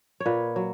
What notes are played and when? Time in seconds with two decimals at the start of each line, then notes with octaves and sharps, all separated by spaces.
0.20 C#5
0.26 A#2 B4
0.56 F#3